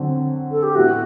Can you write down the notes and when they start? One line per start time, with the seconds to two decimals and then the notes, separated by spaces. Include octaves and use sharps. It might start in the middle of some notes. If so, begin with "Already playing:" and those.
Already playing: D3 F#3 C4 F#4
0.51 A4
0.63 G4
0.75 A2 E3 B3 E4 F#4